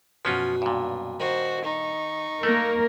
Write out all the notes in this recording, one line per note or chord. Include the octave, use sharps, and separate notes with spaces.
F#2 B2 F3 C#4 F4 B4
G2 A#2
D#3 F#4 C5
D#4 C#6
A3 A#3 A#4